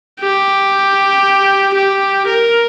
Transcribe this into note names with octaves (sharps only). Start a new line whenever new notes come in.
G4
G4
A#4